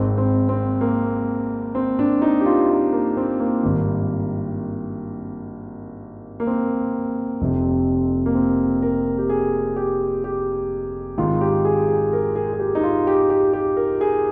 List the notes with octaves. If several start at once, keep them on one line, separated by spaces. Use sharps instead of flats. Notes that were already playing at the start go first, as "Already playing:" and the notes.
Already playing: G#1 G#2 D#3 C4
C4
C4
A#3
C4
D4
D#4
G4
F4
D#4
A#3
C4
A#3
G#1 G2 D#3
A#3
C4
F1 F2 C3
A#3
C4
A#4
G4
G#4
G4
G4
G#1 G#2 D#3 F4
G4
G#4
G#4
A#4
G#4
G#4
G4
D#4
F4
G4
G4
G4
A#4
G#4